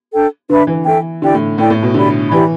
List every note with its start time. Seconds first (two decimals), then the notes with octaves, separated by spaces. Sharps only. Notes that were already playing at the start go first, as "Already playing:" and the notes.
0.13 D4 A4 G5
0.49 D3 D4 B4 E5 B5
0.67 E3
0.85 E3 A4 E5 G5
1.22 D3 E4 G4 D5 G5
1.35 A2
1.58 A2 E4 A4 D5 G5
1.70 A2
1.82 B2
1.94 D3 G4 D5 B5
2.31 E3 E4 G4 D5 B5